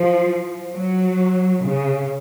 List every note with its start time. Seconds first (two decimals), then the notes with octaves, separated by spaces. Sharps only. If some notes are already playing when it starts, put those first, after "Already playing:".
Already playing: F3
0.74 F#3
1.64 C#3